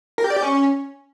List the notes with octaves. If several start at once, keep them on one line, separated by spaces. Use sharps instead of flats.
A#4
G4
D5
G4
C#4